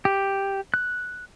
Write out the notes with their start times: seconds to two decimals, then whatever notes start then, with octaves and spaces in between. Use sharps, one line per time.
0.05 G4
0.74 F#6